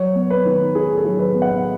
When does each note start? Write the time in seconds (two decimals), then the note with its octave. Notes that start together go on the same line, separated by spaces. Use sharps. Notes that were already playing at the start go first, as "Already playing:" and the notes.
Already playing: F#3 C#5
0.15 B3
0.30 B4
0.45 D#3
0.75 D#3 G#4
0.97 A4
1.05 F#3
1.19 B4
1.34 B3
1.42 F#5